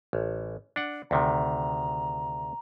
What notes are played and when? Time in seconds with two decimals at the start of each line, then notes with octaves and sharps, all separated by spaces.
0.13 A1
0.76 D4 F#5
1.11 D2 C3 D#3 A#5